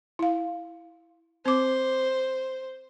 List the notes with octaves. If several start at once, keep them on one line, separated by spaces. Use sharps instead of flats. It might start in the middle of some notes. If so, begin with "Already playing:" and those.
E4 F5
C4 C5 D6